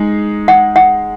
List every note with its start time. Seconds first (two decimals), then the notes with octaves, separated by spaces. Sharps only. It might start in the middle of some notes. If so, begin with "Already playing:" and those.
Already playing: G#3 D#4 G#4
0.48 F#5
0.76 F#5